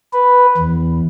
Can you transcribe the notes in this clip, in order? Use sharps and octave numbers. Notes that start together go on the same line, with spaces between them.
B4
E2